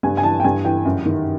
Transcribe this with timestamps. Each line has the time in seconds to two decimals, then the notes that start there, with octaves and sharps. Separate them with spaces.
0.03 G2 G#5
0.17 G#5
0.23 E3 A5
0.40 G5
0.44 G2 G#5
0.65 E3 G5
0.85 F#2
1.05 D#3